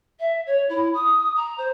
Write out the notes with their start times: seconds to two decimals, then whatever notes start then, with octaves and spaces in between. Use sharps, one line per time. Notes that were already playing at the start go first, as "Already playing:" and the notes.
0.20 E5
0.46 C#5
0.69 E4
0.95 D#6
1.37 A#5
1.58 C5